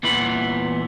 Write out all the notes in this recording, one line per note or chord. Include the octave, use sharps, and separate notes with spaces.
E2 A#2 E3 B3 B5